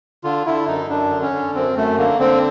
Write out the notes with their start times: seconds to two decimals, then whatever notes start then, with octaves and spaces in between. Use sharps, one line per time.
0.24 D3 F4
0.46 D3 E4
0.67 F#2 D#4
0.89 F#2 D4
1.11 D3
1.22 C#4
1.33 D3
1.55 F#2 C4
1.76 F#2 A3
1.98 D3 A#3
2.19 D3 C4